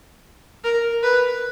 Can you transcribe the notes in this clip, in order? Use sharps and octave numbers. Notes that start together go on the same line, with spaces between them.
A#4
B4